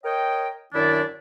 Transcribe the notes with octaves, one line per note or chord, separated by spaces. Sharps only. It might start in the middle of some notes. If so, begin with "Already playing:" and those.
A#4 C#5 D#5 G5
F#2 D#3 D4 E4 D5